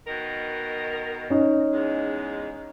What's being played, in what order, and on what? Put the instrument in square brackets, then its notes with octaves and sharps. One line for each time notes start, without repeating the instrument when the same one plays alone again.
[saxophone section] B2 D#3 A#4
[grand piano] C#4 D#4
[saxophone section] E2 G#3